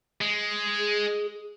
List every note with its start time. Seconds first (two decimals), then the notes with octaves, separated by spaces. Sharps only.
0.21 G#3
0.78 G#4